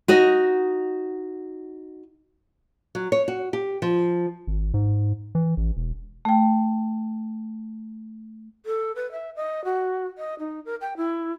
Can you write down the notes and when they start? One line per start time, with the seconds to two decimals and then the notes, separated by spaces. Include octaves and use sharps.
0.08 D#4 F#4 D#5
2.95 F#3
3.12 C#5
3.28 F#4
3.53 G4
3.82 F3
4.47 G#1
4.74 G#2
5.35 E3
5.57 A1
5.77 E1
6.25 A3 G5
8.66 A4
8.96 B4
9.12 E5
9.36 D#5
9.65 F#4
10.18 D#5
10.39 D#4
10.65 A#4
10.81 G5
10.97 E4